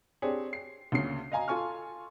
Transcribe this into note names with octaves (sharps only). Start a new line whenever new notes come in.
C4 D4 G4 G#4 C#5
C7
D2 A#2 C#3 C7
D#5 F5 G#5 A#5
F4 A4 G#5 C#6 F6